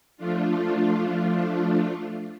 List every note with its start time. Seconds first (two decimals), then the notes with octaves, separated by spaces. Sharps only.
0.17 F3 A3 D4 F4